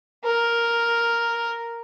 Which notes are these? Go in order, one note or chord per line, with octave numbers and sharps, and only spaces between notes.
A#4